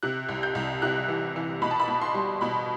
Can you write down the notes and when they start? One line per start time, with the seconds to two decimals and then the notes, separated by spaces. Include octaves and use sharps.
0.03 C3 F#6
0.29 C2
0.43 G6
0.55 C2
0.82 C3 F#6
1.08 E3
1.36 E3
1.62 B2 B5
1.71 A5
1.80 B5
1.88 B2
2.02 C6
2.14 G3
2.41 B2 B5